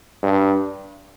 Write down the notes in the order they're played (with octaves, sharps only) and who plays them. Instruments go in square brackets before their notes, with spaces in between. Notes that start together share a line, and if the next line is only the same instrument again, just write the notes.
[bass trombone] G2